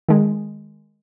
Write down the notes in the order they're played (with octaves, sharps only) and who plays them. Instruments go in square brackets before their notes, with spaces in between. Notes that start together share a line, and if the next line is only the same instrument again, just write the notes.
[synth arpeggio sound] D#3 G#3